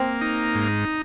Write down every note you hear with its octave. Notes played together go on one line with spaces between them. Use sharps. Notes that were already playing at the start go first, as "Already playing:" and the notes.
Already playing: A#3 C4
D#4
G#2